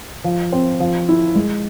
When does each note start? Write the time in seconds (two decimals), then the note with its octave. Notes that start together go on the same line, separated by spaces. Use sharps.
0.24 F3
0.52 C4
0.80 F3
1.08 E4
1.35 G#3